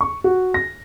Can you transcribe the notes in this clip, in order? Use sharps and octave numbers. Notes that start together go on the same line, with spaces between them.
C#6
F#4
A#6